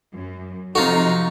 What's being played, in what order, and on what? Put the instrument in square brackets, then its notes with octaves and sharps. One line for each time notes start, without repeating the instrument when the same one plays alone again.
[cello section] F#2
[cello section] C3 F3 [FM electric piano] C4 A4 [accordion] D#4 A#5 [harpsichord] F4 F#4